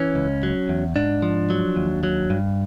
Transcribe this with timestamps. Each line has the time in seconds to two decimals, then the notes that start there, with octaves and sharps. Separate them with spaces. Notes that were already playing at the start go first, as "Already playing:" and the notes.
Already playing: E3 C#4
0.15 C#2
0.43 F#3
0.69 E2
0.96 G#2 D4
1.22 F3
1.50 F#3
1.76 D#2
2.03 F#3
2.30 G2